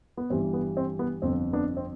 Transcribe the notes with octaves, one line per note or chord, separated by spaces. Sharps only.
B3
G1 G2 E3 G3 C4
B3
C4
B3
G1 F2 D3 C4
B3 D4
C4